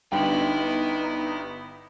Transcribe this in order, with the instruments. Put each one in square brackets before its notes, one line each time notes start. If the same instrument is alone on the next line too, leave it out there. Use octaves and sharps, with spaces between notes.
[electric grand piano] G1 G2 C6 [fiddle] B3 E4 [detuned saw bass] D#4 [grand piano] G5